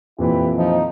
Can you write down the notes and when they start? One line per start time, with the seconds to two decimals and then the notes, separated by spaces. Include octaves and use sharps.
0.18 F2 A#2 E3 E4 G4 B4
0.56 F3 D#4